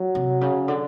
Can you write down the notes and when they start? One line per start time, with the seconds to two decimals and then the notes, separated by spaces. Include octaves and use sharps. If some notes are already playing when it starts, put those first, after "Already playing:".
Already playing: F#3
0.15 C3
0.41 C#3
0.68 D3